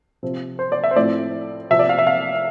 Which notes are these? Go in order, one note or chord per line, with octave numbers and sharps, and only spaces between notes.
C3 F3 C4
C5
D5
E5
C5
A2 F3 C4 D5
C3 F3 C4 E5
D5
F5
E5
F5